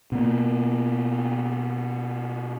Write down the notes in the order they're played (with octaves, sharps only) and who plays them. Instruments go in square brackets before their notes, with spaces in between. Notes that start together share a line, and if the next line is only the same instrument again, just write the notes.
[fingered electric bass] B2 A#3